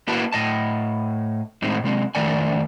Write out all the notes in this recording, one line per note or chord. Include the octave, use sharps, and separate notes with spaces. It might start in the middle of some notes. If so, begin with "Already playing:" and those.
A#3 E4 F#4 B4 G5 A5
A2 D#5 A5
A2 G#3 C4 D#4
C3 G#3 C4
F2 D#3 A3 D5 G#5